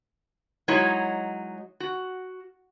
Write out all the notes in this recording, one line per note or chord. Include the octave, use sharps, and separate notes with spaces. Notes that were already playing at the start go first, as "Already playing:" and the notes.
F#3 G#3 D#4 E4 C#5
F#4